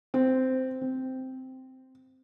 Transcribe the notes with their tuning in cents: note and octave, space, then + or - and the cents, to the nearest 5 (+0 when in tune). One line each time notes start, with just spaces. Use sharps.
C4 -10
C4 -5